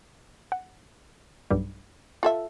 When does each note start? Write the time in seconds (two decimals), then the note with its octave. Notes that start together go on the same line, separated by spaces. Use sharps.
0.52 F#5
1.51 B1 G2 G3
2.23 F4 A4 E5